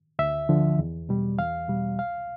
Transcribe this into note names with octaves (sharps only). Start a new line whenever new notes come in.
D2 E5
D3 F3
E2
B2 G3
E2 F5
B2 G3
C2 F5